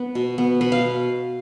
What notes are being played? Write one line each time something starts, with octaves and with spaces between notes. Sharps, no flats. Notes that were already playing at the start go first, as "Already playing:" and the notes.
Already playing: B3 B4
B2
B3
B2 B4
F5